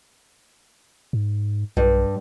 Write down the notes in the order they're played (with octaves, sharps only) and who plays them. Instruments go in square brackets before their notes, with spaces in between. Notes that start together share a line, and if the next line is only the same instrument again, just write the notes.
[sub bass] G#2
[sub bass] B1 [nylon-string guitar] G2